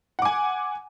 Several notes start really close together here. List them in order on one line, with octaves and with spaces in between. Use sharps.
F#5 D6 G#5